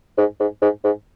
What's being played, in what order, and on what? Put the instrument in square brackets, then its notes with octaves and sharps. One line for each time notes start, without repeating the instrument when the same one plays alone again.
[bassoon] G#2
G#2
G#2
G#2